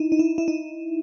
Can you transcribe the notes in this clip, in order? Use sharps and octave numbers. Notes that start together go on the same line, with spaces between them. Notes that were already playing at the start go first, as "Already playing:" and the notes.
Already playing: D#4 E4
D#4
E4
E4
D#4